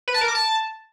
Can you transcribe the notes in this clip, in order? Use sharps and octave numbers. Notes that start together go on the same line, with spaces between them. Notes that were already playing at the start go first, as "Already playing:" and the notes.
B4
A5
A#4
D6
A5